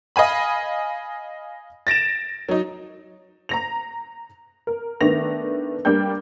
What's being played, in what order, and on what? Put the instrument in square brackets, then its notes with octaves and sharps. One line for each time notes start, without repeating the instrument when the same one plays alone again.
[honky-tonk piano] D#5 F5 G#5 B5
A6 A#6 D7 E7
F#3 D#4
A#5 A#6 F7
A#4
D#3 A3 B3 D4 A#6 F7
G3 A#3 D4 G5 G6